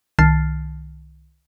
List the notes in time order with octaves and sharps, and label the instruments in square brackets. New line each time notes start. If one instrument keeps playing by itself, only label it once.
[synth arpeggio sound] C2 D#3 A5 F6 A6 C7